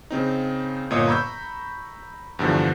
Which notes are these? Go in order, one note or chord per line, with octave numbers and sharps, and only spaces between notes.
C#3 C4 D#4
G1 A#2 B3 C#5 D#5 D#6
A#5 B5 C#6 E6 G6
E2 G2 D3 F3